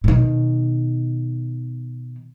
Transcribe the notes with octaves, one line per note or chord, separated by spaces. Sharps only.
B2 D#3